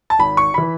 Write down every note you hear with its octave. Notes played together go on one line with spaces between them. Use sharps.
A5
G#1 B5
C#6
E3 B5